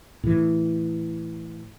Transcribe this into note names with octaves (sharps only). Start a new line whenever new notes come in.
A2 E3